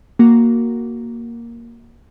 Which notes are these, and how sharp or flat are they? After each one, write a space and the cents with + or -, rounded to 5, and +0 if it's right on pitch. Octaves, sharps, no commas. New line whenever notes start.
A#3 +0 F#4 +0